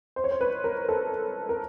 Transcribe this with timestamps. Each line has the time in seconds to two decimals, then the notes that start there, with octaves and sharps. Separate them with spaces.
0.16 C5
0.24 C#5
0.31 C5
0.41 B4
0.64 A#4
0.89 A4
1.49 A#4